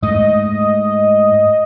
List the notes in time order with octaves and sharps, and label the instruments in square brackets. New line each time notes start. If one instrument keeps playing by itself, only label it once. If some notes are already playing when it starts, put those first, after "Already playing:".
[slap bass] G#2 A3 [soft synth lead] D#5